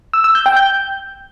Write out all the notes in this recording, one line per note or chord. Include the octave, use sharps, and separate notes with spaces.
E6
E6
G6
G5
G6